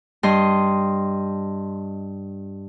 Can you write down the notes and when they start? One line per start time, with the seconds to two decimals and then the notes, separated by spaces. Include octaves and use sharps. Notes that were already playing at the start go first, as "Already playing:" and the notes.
0.23 G2 D#5 C6